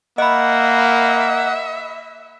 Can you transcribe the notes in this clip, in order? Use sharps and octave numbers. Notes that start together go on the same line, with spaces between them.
A#3 D#5 E5 F#5 B5